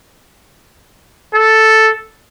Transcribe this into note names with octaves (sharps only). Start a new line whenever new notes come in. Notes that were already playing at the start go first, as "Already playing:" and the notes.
A4